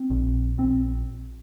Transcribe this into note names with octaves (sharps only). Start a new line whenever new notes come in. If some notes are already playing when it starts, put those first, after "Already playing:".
Already playing: C4
A#1
A#1 C4